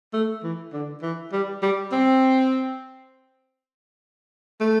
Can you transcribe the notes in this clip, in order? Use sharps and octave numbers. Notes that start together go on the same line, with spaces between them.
A3
E3
D3
E3
G3
G3
C4
A3